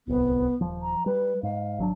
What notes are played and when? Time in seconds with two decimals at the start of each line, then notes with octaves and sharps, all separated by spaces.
0.07 D1 C2 B3
0.61 D#1 F3
0.82 A#5
1.06 G3 B4
1.43 G#2 F5
1.78 G#1 F#3 D4